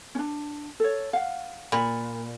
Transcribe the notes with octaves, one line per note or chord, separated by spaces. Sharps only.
C#4 D4
A4 C#5
F5 F#5
A#2 B5